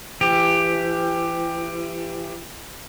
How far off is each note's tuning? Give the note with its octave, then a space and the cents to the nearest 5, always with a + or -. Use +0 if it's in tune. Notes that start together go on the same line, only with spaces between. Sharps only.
E3 +35 G4 +10